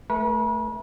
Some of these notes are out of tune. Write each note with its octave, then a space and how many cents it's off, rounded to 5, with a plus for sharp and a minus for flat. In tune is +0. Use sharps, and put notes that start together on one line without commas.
A3 +0 B4 -45